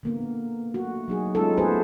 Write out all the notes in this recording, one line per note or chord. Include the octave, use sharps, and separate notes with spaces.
D3 A#3 B3
A3 F#4
F#3 D#4 G#4
G#3 C#4 D#4 F4 A4
A3 B3 F#4 G#4 B4 C5